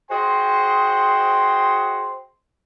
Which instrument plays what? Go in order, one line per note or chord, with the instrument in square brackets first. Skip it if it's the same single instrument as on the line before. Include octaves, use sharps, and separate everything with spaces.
[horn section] F#4 G#4 C5 D#5 G5 C6